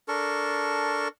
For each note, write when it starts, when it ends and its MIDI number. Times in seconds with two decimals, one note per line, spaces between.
0.08 1.08 62
0.08 1.08 69
0.08 1.08 70
0.08 1.08 85